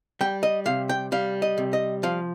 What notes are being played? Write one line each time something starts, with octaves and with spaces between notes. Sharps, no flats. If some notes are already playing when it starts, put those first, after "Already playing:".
G3 G5
D#5
C3 F5
G5
G3 F5
D#5
C3
D#5
F3 F5